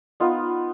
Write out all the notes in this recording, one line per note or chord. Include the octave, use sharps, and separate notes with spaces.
B3 D#4 F4